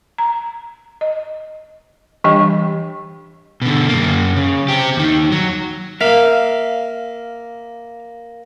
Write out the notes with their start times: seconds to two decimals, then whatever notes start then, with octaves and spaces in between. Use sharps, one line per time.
0.18 A#5
1.01 D#5
2.24 E3 G3 D4 G4 D#5 G5
3.62 B2 D3
3.89 F#2 A#3
4.36 C#3
4.69 C4 G4
4.97 D#2 D#3
5.32 F#3
6.01 A#3 E5 F5